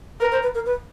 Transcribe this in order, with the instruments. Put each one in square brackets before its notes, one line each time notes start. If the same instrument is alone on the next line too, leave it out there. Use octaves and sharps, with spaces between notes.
[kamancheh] A#4 [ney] B4
[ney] C5
B4
A#4
B4